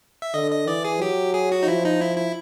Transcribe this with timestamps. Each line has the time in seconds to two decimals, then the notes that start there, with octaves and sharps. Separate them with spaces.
0.22 E5
0.34 D3 D#5
0.51 D#5
0.68 E3 D5
0.85 G#4
1.01 F#3 G4
1.34 G#4
1.52 F#4
1.63 D#4
1.67 F3 E4
1.85 D#4
2.01 E4
2.17 E4